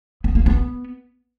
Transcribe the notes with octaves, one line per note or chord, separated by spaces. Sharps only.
B3
A#3
B3